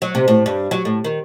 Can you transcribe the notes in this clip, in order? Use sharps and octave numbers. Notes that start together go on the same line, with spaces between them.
F#3
C3
A2
G2
F#3
A2
D#3